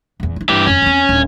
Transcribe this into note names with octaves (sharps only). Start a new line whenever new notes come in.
D#1 E2
E4 F4
G2 E3 G4
F2 D#3 C#4
E2 C4
D1